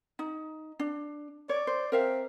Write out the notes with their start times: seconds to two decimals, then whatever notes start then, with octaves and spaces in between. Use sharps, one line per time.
0.19 D#4
0.79 D4
1.49 C#5 D5
1.67 C5
1.92 C4 A#4 E5 F5